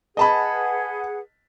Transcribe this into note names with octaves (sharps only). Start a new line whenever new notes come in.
G#4 B4 D#5 F#5 A5 B5